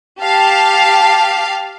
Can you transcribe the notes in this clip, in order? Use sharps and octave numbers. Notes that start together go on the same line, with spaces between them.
G4 F5 A5